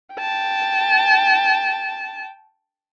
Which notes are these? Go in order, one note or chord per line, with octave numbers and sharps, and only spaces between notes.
G5 A5